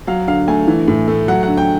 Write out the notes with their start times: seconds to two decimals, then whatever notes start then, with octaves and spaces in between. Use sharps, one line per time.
0.07 F#3 F5
0.27 D3 F5
0.48 A3 G#5
0.68 E3
0.88 A2
1.08 A3
1.28 F#3 F#5
1.43 D3 F#5
1.57 G5